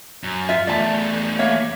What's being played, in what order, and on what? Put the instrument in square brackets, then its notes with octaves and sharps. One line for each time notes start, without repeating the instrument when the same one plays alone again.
[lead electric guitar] F#2
[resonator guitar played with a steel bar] F4 E5
[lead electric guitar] E2 A3 [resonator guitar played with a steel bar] D5 A5
[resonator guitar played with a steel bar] A#3 C#5 E5